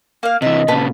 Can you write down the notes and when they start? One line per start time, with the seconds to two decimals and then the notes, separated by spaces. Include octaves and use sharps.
0.23 A#3 F5
0.42 C3 E3 D#5 E5
0.68 A#2 C#3 B4 A5 B5